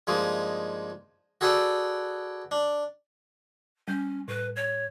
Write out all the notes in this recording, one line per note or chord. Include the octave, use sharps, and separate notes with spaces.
G2 F3 G#3 A#3 D#4
F#4 G#4 A4 B4 D5 G5
D4
G3 C#4 G6
A2 B4
C#5